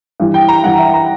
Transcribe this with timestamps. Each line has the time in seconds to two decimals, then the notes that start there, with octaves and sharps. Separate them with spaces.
0.20 G2 E3
0.34 G5
0.48 A#5
0.63 G2 E3 F#5
0.79 E5
0.93 A#5